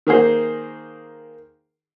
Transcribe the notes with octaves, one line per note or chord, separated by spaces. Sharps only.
D#3 A#3 G#4 C5